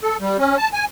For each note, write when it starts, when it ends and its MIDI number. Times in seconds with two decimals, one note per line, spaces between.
0.03 0.17 69
0.20 0.37 55
0.38 0.57 61
0.58 0.69 81
0.73 0.85 80